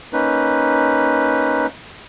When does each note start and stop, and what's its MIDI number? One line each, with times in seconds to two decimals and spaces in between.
0.13 1.67 58
0.13 1.67 61
0.13 1.67 63
0.13 1.67 71